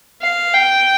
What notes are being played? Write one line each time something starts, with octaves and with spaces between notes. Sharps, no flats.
F5
G5